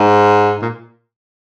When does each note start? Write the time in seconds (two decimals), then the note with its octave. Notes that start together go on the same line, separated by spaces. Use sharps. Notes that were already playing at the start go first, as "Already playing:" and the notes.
Already playing: G#2
0.62 A#2